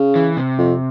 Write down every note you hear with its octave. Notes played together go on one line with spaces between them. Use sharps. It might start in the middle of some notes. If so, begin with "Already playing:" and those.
Already playing: C#3
E3
C3
F2